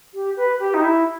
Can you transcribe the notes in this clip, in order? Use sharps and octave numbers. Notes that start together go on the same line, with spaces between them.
G4
B4
G4
D#4
E4